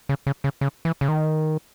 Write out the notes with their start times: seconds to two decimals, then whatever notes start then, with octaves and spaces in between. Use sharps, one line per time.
0.09 C#3
0.26 C#3
0.44 C#3
0.61 C#3
0.85 E3
1.01 C#3
1.08 D#3